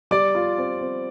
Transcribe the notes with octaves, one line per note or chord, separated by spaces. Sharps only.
G3 D5 D6
F4
C4
C4